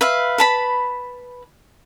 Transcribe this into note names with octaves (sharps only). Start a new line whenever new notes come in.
B4 E5 F5
B4 A5 B5